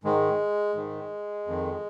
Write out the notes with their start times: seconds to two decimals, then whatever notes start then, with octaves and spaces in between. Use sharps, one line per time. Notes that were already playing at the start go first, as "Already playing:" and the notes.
0.04 G#2 D#3 G#3
0.75 G#2 D#3
1.47 F2 D#3